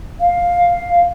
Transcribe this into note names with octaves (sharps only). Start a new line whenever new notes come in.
F5